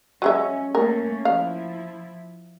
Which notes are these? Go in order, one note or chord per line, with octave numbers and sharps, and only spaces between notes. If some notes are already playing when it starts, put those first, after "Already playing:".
F#3 G#3 C#4 E5
A3 A#3 C#4 A#4
F3 E4 F5